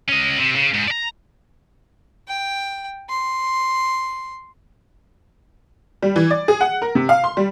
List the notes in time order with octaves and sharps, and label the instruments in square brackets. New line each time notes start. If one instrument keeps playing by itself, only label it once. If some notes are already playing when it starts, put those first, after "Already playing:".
[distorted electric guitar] C#4 D#5
C3
C#3
G#2
D5 A#5
[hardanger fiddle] G5
C6
[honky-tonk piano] G3
E3
D5
G#4
F#5
A#4
C3
F5
C6
G3